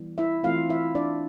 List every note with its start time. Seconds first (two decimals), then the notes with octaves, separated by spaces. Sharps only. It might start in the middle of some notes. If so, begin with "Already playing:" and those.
Already playing: E3 G3 B3
0.18 E4 E5
0.43 E3 A3 C4 F4 F5
0.70 E4 E5
0.95 D4 D5